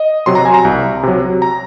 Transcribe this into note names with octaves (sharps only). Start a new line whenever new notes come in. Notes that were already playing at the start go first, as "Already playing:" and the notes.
Already playing: D#5
C3 F#3 C6
A#5
G#5
A#5
C2
C3 F#3
A#5